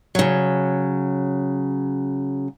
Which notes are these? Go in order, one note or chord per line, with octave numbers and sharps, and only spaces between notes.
C#3 F#3